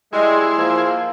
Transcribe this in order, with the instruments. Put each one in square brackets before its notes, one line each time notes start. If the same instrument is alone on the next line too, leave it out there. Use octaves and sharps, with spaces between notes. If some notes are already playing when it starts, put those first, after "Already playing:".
[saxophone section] G3 G#3 [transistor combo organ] E4 G#4 C6
[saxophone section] F3 A#3